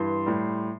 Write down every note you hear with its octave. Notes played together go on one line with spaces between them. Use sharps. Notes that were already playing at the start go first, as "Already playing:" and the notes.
Already playing: G2 E3 C6
A2 G3